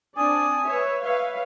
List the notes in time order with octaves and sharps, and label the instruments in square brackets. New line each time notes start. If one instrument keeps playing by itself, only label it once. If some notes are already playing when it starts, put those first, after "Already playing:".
[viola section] C4 D4 D5 [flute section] G#5 D#6
[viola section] B4 C#5 E5
[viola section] B4 C#5 F5 [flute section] E5